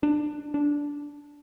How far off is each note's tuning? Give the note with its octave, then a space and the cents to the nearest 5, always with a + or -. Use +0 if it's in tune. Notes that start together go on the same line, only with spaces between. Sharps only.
D4 +20
D4 -10